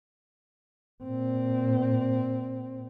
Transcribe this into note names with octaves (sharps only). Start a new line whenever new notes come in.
A#2 C4